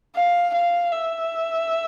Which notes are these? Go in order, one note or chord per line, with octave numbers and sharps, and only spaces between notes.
F5
F5
E5